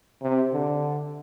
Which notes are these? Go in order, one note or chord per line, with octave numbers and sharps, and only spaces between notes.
C3
D3